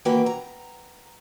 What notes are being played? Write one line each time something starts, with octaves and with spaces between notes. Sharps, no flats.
D#3 E3 A#3 F#4 B4 G5
A#5